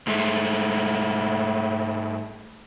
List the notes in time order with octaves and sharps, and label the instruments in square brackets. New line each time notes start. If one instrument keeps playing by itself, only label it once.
[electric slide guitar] G#2 G#3 A3